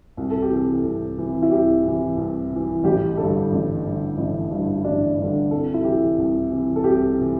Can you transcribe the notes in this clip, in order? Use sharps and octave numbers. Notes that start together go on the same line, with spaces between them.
C2
A4
G4
C3 E3 A4
C2
C3 E3
E4
C2 G4
C3 E3
C2
C3
E3
A1 G4
G2 D3 A4
A1
G2 D3
A1 E4
G2 D3
E4
A1 D4
G2 D3
C2 A4
E4
C3 E3 G4
C2
C3 E3
A4
C2 G4
C3 E3